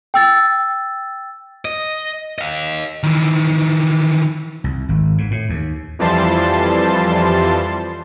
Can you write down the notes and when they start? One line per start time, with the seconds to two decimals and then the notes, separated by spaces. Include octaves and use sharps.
0.14 G5 E6 A6
1.65 D#5
2.38 D#5 F5
3.03 D#3 E3
4.64 C2
4.89 G#1
5.18 G#2
5.31 A2
5.49 D#2
5.99 F2 E3 F3 G3 A5 C6